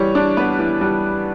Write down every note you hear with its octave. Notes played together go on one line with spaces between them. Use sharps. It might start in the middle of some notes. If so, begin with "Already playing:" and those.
Already playing: E3 G3 C#5
D4
B3 B4
E3
G3